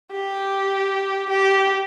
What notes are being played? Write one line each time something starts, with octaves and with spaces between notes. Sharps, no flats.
G4
G4